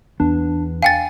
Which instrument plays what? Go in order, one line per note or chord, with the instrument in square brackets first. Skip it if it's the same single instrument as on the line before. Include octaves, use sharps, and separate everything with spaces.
[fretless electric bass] E2 B3 [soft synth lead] D4
[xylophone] F5 G5 A6 [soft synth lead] G#5